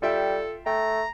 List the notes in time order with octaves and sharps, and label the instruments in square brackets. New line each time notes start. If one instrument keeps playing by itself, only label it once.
[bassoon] G3 [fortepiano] F4 E5 G5 [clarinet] A4
[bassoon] A3 [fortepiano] G5 [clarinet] A#5